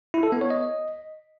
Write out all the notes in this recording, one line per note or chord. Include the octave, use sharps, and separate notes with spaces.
E4
A4
B3
C#5
D#5